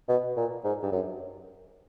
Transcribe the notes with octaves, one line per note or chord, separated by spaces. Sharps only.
B2
A#2
G#2
G2
F#2